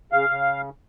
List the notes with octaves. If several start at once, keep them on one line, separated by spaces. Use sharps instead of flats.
C#3 F5
C#3